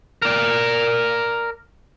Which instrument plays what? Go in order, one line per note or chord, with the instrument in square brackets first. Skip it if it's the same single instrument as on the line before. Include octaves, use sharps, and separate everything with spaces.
[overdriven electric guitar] A#4 D5